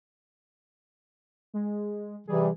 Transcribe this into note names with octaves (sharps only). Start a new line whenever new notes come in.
G#3
C3 E3 G3 G#4